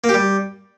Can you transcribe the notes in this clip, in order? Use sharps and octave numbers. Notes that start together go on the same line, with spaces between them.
A#3
G4
G3